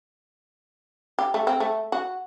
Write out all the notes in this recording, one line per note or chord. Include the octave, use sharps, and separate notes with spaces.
G4
A3
C4
A3
F#4